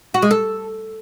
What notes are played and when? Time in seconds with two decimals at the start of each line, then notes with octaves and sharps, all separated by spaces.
0.14 F#4
0.22 G#3
0.31 A4